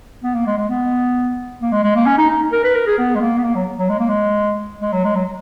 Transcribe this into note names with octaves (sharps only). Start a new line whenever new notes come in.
B3
A#3
G#3
G#3
B3
A#3
G#3
G#3
A#3
C#4
D#4
D#4
A#4
B4
A#4
G#4
B3
G#3
A#3
B3
A#3
F#3
F#3
G#3
A#3
G#3
G#3
F#3
G#3
F#3